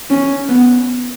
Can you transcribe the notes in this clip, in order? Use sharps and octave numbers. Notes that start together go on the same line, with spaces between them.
C#4
B3